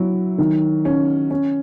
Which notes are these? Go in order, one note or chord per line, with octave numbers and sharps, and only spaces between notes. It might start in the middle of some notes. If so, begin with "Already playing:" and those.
Already playing: F#3 E4
D#3
C#4
C#4